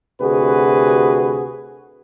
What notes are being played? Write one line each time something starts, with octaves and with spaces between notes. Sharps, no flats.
D2 C3 F#4 G#4 B4